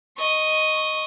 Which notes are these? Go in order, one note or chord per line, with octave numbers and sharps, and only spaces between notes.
D#5 C#6